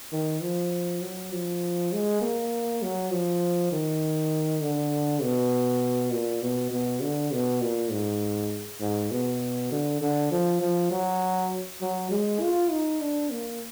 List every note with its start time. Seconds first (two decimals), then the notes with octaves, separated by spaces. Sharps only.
0.12 D#3
0.42 F3
1.02 F#3
1.32 F3
1.93 G#3
2.21 A#3
2.82 F#3
3.12 F3
3.72 D#3
4.61 D3
5.22 B2
6.12 A#2
6.42 B2
6.71 B2
7.02 D3
7.32 B2
7.61 A#2
7.91 G#2
8.81 G#2
9.11 B2
9.72 D3
10.01 D3
10.31 F3
10.61 F3
10.91 F#3
11.82 F#3
12.11 G#3
12.41 F4
12.71 D#4
13.01 D4
13.30 A#3